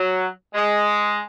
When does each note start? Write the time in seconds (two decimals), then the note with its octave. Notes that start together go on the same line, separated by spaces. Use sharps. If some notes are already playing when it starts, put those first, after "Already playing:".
Already playing: F#3
0.54 G#3